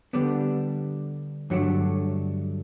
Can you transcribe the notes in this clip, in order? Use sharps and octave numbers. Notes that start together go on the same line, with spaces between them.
D3 G3 B3 D4
G2 D3 F#3 A3 D4